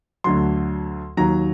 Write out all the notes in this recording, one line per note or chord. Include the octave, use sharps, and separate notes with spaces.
D2 D3 F#3 C6
D#2 D#3 F#3 A#5